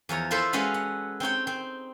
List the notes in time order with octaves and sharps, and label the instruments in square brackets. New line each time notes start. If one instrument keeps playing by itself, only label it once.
[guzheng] E2 F3 C#5 A#5
E4 F4 A4 C5 E5
G#3 C#4 F#4 A4 B4 F5
F#5
C4 D#4 C#5 G5
C4